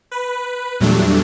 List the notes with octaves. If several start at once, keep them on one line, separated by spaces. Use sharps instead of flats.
B4
E2 A#2 F#3 G3 A3 D4